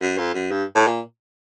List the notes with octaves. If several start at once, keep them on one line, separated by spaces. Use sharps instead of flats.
F#2
F2
F#2
G2
A2
A#2